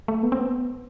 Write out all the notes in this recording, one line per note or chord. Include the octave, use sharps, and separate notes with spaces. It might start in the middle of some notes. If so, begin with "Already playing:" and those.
A3
B3
C4
B3